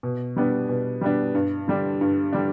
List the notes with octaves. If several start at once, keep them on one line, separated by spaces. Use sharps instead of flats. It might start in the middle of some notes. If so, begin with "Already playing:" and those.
B2
G3 B3 D4
B2
G3 B3 D4
G2
D3 G3 D4
G2
D3 G3 D4